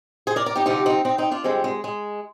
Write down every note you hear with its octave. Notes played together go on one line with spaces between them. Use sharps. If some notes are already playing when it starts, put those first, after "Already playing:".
G#4 C5
A#4 D5
A#4 D5
D#4 G4
D2 C3 F3 D#4 G4
C4 D#4
C4 D#4
C4 D#4
D4 F4
F2 D3 G3 G#3 C4
G#3
G#3